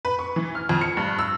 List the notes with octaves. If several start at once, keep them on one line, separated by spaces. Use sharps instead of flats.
B4
C#6
E3
F6
F2
C#7
G2
E6